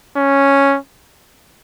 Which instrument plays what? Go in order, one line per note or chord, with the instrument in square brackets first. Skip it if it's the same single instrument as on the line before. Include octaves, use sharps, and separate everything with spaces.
[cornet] C#4